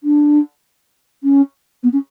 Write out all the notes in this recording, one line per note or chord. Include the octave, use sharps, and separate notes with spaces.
D4
C#4
B3
C#4